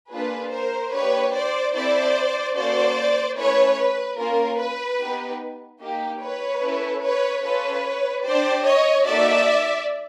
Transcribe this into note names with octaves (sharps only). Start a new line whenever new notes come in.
A#3 D4 F4 G#4 B4
A#4 C5
A#3 D4 G4 B4 C#5
C5 D5
C4 E4 A4 C5 D5
A#3 C#4 F#4 A4 C5 D5
A3 C#4 E4 B4 C#5
B4
A#3 C#4 F4 A#4
B4
B3 D#4 G4
A#3 D#4 G4
B4 C#5
C#4 E4 A4
B4 C#5
C#4 F4 A4 B4 C#5
D4 G4 C5 D5
C#5 D#5
A#3 D#4 F#4 A4 D5 E5